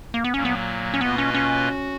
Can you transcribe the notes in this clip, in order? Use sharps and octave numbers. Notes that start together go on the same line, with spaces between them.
A#3
B3
A#2 F#3 A#3 C#4
B3
C#4
B2 A#3 B3 F4 B4 D#5
C#4
C#4
F#4